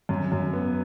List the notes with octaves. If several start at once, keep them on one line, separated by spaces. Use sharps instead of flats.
F#2
F#2
B3